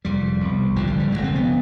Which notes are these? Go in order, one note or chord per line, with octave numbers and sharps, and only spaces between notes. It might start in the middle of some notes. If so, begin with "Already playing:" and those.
F1 F2 C3 G3
C2 B2
G#1 G2 D3 F3
G3
G3
F1 D#2 D3 G#3
C4
B3